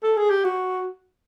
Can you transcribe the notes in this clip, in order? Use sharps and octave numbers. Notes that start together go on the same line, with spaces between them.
A4
G#4
G4
F#4